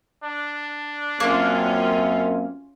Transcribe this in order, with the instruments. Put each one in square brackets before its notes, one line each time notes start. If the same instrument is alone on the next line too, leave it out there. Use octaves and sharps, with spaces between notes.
[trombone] D4
[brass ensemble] F#2 C4 [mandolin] A#3 [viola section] C#4 F4